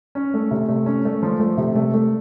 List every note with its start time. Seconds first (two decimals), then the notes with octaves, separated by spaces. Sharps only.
0.15 C#4
0.34 A3
0.51 C3
0.68 A3
0.86 C#4
1.05 A3
1.23 F3
1.40 A3
1.57 C3
1.75 A3
1.94 A3